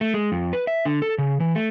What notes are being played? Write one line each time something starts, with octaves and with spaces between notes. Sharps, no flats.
A3
G#3
F2
B4
E5
D3
A4
C#3
E3
A3